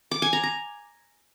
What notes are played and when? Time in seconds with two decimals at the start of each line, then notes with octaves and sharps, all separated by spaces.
0.11 D6
0.22 G#5
0.33 A#5
0.43 A#5